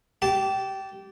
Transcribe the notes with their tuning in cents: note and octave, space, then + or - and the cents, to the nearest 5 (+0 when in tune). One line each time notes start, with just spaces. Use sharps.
G4 -20 A5 +0